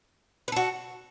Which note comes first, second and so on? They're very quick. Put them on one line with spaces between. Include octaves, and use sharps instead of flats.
B4 A4 F#4